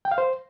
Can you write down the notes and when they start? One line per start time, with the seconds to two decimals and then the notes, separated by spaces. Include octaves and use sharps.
0.05 G5
0.11 F5
0.18 C5